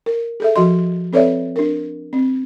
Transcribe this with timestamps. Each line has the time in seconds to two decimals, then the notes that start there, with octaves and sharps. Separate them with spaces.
0.06 A#4
0.40 G#4 A4 E5
0.56 F3 F#4 D#5 C6
1.13 C4 A4 B4 C#5 D5 E5
1.56 D4 A#4
2.13 C4